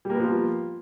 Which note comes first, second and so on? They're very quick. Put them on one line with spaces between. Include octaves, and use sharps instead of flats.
G3 A#3 B3 F3 F4